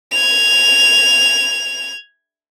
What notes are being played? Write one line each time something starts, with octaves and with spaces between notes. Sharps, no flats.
G#6 F7